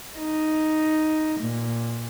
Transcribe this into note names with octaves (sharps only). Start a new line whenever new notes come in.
D#4
A#2